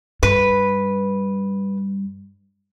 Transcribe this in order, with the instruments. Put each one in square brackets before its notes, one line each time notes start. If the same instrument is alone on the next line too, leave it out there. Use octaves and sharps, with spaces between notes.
[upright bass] G2 [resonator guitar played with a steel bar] B4